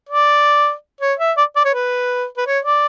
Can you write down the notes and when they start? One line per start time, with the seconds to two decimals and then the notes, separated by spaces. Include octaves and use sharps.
0.09 D5
1.01 C#5
1.19 E5
1.37 D5
1.56 D5
1.65 C#5
1.74 B4
2.37 B4
2.46 C#5
2.65 D5